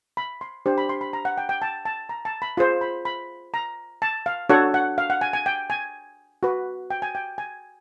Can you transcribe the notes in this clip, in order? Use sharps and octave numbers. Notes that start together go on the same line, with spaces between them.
B5
C6
D4 G4 C5
B5
C6
B5
A#5
F#5
G5
G5
A5
A5
A#5
A5
B5
F4 G#4 C5 C6
B5
B5
A#5
A5
F5
D4 F#4 A4 C#5 F#5
F#5
F5
F#5
G#5
G#5
G5
G#5
F#4 B4
G5
G#5
G5
G#5